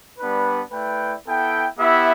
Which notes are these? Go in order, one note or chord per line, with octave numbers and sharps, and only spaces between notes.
G3 B3 D4 B4
A3 E4 B4 D5 G5
B3 E4 A4 G5
B3 E4 G4 E5